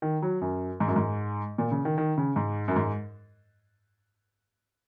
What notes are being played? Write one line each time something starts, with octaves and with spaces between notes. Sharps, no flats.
D#3
F#3
F#2
G#2
F#2
G#2
A#2
C#3
D#3
D#3
C#3
G#2
F#2
G#2